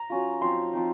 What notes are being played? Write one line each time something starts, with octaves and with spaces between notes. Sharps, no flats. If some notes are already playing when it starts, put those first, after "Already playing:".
Already playing: A#5
F#3 C#4 F4
F3 C4 D#4 C6
F3 C4 D#4